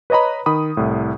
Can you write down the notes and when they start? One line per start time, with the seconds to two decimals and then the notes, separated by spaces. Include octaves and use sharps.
0.10 B4 C#5 D#5 A#5 B5
0.46 D#3 B5 D#6
0.77 C2 A2